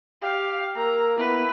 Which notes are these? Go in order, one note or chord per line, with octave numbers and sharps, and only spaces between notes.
G4 F5
A#3 A#4 A#5 E6
B3 E4 B4